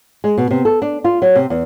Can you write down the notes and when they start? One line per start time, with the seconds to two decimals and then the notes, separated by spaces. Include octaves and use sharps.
0.24 G#3
0.38 B2
0.51 C3
0.65 A4
0.82 D4
1.04 F4
1.22 F#3
1.36 C3
1.50 E2